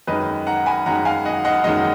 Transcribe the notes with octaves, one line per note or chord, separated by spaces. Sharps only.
F#2 D#3 G#3 B4 D#5
F#5 A#5
G#5 B5
F#2 D#3 G#3 F#5 A#5
F5 G#5
D#5 F#5
D#5 F#5
F#2 D#3 G#3 D#5 F#5